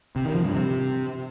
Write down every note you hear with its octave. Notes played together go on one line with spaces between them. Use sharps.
C3
D#3
F3
G2
C3